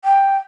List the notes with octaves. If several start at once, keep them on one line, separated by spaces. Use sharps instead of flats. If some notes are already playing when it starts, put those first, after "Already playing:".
G5